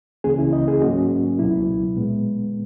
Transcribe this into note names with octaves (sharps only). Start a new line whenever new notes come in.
C#2 C#3 E3 A#3 C#4 G#4
E4
D#5
G#4
G#2 F#3 A#3 C#4 F#4
C#2 B2 F#3 B3 E4
A#2 G#3 B3